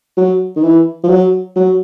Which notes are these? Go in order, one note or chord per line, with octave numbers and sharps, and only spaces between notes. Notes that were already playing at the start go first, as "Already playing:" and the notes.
F#3
D#3
E3
F3
F#3
F#3